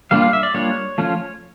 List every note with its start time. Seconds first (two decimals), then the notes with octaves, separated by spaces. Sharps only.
0.11 G3 A#3 D4 F4 F5
0.22 F5
0.33 E5
0.43 D5
0.54 G3 A#3 D4 F4 C#5
0.98 F3 A3 C#4 F4